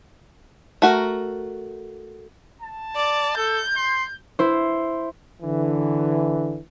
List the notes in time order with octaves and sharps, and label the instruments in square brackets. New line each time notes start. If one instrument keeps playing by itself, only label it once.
[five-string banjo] A3 F#4 A#4
[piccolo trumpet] A5
[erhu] D5
[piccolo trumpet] A4 [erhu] G6
[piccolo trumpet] C6
[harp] E4 C5
[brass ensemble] D3 E3